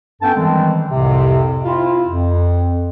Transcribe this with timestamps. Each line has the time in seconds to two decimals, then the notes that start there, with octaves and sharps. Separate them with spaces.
0.22 G2 B3 C#4 A4 G5 A5
0.35 D#3 E3 G3 G#3 C4
0.91 C2 F2 A2 C3
1.64 C4 E4 F4
2.07 F2